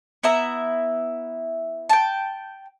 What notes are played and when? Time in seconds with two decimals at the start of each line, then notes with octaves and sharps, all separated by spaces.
0.23 B3 E4 E5 A#5
1.89 G5 A5